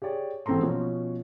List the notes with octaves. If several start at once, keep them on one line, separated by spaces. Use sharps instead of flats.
G4 G#4 C#5 D5
A1 G#2 C4 A4 A#5 C6
B2 F3 C#4